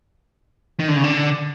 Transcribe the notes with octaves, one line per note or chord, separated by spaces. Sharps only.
D#3
D3
C#3
D3